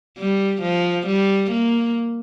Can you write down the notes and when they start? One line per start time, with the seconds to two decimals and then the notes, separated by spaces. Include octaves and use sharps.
0.18 G3
0.62 F3
1.07 G3
1.51 A#3